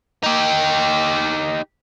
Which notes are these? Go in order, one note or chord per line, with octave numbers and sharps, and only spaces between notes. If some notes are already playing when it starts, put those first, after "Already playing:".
D#4 G4